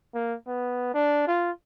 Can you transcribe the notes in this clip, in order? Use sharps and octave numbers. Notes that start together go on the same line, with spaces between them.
A#3
B3
D4
F4